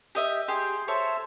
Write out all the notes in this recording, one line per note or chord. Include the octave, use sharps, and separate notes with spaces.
G4 D#5 E5
G4 G#4 C6
A4 C5 C#5 E5